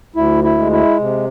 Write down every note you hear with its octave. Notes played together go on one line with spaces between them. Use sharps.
D2 E4
E4
G#3
E4
C3